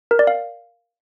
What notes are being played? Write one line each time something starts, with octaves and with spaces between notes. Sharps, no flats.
A#4
D5
F5